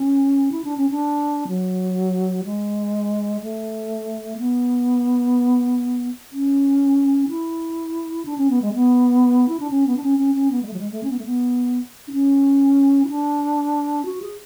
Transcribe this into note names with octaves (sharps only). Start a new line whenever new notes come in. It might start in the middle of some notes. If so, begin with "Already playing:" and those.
Already playing: C#4
E4
D4
C#4
D4
F#3
G#3
A3
B3
C#4
E4
D4
C#4
B3
G#3
B3
E4
D4
C#4
B3
D4
C#4
C#4
C#4
B3
G#3
A3
F#3
G#3
A3
C#4
B3
A3
B3
D4
C#4
E4
D4
F#4
G#4